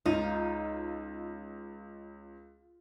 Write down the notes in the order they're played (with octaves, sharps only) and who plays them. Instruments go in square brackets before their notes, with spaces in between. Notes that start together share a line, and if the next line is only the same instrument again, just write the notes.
[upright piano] C#2 [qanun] D#4 [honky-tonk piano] F4